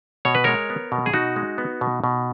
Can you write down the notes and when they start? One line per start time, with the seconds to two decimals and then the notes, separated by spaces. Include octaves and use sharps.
0.25 B2 C#5
0.35 B4
0.44 G#3 A#4 C#5
0.70 B3
0.92 B2
1.06 G#4
1.14 B2 D#4 F#4
1.36 G#3
1.58 B3
1.81 B2
2.04 B2